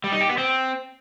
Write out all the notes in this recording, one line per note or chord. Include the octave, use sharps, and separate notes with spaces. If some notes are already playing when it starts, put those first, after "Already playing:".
G3
D#4
G4
B3
C4